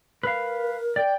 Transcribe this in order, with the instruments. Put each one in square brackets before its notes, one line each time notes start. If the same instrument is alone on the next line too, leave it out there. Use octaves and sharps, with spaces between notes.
[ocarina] A#4 [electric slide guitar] B4 F5
[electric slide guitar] D5 [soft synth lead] G5